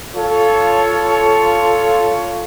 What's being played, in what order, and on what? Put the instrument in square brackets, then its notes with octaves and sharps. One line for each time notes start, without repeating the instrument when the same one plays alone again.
[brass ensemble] F4 A4 C#5